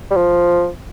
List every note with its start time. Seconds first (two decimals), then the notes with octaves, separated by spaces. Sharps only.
0.11 G3
0.16 F3